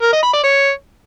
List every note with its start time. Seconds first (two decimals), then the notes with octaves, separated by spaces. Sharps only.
0.02 A#4
0.13 D#5
0.23 B5
0.33 D5
0.44 C#5